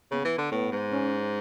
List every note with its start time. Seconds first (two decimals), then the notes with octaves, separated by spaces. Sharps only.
0.11 C#3 B3
0.25 E3
0.38 D3
0.51 A2 B3
0.72 G#2
0.91 C#4